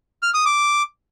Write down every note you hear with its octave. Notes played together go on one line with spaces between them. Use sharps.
F6
D#6
D6